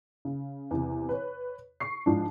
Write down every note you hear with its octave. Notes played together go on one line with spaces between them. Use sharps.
C#3
E2 C3
B4 C#5
C#6 C7
G#2 F3 D4